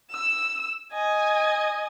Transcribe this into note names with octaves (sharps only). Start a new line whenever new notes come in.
E6
D#5 G#5